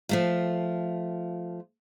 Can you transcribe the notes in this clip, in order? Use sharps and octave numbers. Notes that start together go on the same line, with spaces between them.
F3 A3 F4